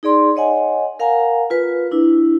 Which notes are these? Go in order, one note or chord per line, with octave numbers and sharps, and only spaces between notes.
D#4 G#4 D5 C6
C#5 D#5 F#5 G#5
A#4 F5 F#5 G#5 A#5
F4 B4
D4 E4